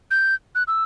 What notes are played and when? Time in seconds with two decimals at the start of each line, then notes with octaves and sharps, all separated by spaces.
0.11 G6
0.55 F#6
0.68 E6